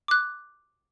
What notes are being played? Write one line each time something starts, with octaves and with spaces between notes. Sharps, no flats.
D6 F#6